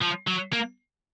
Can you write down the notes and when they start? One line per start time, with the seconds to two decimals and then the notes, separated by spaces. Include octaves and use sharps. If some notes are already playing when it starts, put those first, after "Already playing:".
0.01 F3
0.27 F#3
0.53 A#3